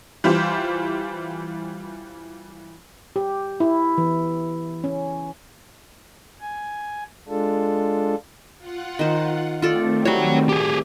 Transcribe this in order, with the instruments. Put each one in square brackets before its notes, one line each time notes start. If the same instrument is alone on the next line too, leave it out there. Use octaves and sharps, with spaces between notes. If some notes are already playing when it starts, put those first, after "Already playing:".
[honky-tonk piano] E3 G3 F4 C5
[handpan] G4
E4
E3
C#4
[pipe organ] G#5
G#3 D4 F4 A4
[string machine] F4 F#5
[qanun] D#3 C5
[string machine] D#3 A3 C4 [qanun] F4 A4 D5
[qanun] G3 F#4 [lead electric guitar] C#5 F#5
[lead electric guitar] G4 G#4